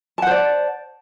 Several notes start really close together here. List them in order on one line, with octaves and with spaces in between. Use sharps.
A5 F#5 C5 D5